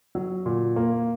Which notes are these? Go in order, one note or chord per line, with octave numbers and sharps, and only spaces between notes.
F#3
A#2
A#3